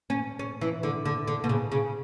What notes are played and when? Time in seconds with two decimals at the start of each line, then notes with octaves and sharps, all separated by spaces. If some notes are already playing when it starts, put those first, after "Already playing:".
0.10 C#4
0.39 C#4
0.61 E3
0.83 D3
1.05 D3
1.28 D3
1.44 B2
1.49 C#3
1.72 C#3